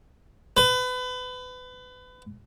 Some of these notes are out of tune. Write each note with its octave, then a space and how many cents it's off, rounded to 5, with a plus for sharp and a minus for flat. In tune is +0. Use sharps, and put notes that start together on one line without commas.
B4 +30